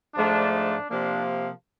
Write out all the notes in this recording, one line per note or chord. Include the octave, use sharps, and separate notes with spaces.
G#2 F3 A3 D4
D4
C3 F3 A#3 D4